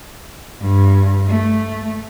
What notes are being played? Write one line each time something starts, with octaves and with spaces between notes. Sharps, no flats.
G2
A3